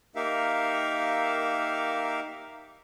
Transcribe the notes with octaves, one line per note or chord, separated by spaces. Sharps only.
A#3 D#4 G4 A#4 E5 F5